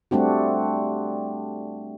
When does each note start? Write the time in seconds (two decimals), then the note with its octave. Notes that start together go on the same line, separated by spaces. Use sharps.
0.11 G3 A3 C4 D4 F#4